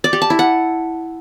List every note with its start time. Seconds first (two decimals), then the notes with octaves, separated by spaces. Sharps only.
0.04 D5
0.13 G4
0.22 A5
0.30 E4
0.39 F#5